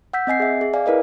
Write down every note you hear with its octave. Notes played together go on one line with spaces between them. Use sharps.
F#5 E6 G6 B6
C4 D#5 G#5 C7
G#4 E5
G#4
D5 F5 G#5
E4 A#4 B4 D#5